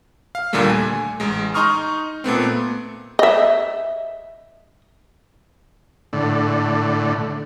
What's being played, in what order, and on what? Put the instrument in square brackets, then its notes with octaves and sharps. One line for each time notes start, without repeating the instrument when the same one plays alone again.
[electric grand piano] F5
D#2 A#2 D3 G3 A3 A#3
G#5
A1 G#3
D#4 A#5 C6 C#6 D#6 F6
A#2 A3 B3 C4
[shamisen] D#5 E5
[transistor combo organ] A2 D3